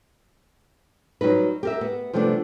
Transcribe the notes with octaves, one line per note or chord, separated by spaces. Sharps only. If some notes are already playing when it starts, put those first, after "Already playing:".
F#3 G3 D#4 B4
G4 A#4 E5
B3
C3 F3 G3 A3 B3 D4